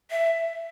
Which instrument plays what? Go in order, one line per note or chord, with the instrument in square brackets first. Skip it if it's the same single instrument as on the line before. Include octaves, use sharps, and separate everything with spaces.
[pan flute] E5